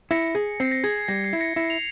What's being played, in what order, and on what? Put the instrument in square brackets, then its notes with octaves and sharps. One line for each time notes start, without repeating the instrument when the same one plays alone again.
[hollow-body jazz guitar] E4 [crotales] A#6 C#7
[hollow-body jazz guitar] G#4
[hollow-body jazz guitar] C4 [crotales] C7
[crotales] A#6
[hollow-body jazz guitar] G#4 [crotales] G#6
[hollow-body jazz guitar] G3 [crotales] A#6
[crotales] C7
[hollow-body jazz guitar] E4
[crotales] A#6 C#7
[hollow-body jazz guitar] E4 [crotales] A#6 C#7
[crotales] F7